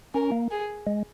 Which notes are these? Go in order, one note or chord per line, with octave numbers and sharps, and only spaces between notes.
C#4 A#4
A#3
G#4
G#3